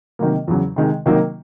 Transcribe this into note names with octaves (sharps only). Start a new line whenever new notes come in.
C3 D#3 F#3 A#3
E2 C#3 F#3
C3 D#3 G#3
C3 D#3 F#3 A#3 D#4